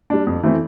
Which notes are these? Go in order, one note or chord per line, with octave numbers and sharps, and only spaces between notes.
G3 D4
F2
E3 A3 C4